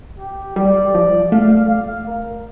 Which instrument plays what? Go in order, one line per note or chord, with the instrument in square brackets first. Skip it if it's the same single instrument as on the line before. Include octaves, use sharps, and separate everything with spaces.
[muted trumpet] G4
[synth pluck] G3 [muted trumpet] D5
[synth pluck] F3
[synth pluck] A3 [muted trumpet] F5
[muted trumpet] F5
A#4